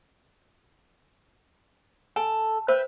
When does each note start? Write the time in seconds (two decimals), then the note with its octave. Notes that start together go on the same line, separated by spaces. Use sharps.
2.16 A4 G#5
2.68 B4 C5 E5 G5